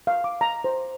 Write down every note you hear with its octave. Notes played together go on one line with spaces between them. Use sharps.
F5
D6
A#5
C5